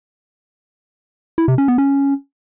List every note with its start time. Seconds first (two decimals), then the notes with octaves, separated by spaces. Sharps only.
1.38 E4
1.48 C3
1.58 C#4
1.68 B3
1.78 C#4